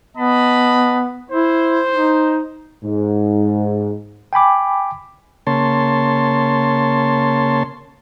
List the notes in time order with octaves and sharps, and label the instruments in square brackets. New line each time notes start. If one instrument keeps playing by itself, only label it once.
[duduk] B3 [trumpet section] D#5 A5 B5
[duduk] E4 [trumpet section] C5
[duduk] D#4
[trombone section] G#2
[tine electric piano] G5 G#5 B5 D6
[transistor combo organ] C#3 A#3 C#5 A5 C6